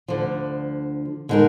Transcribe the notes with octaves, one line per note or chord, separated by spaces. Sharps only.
D2 D3 F3
D3 G#3 D#4 A#4